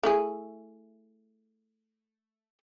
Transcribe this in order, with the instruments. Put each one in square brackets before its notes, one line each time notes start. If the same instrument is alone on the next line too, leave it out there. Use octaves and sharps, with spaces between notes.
[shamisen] A3 E4 G#4